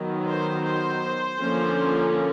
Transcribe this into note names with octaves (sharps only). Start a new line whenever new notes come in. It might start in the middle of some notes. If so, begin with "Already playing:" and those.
Already playing: D#3 F#3 B3
C5
C5
D3 F3 A#3 C#4